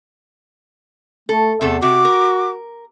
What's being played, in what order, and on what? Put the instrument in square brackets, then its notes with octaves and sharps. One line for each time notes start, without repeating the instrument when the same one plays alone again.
[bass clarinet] A3 [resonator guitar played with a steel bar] A4
[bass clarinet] E2 [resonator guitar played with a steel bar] C3 A3 A4
[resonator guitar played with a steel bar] C3 [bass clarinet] F#4 [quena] D6
[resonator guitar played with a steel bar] A#4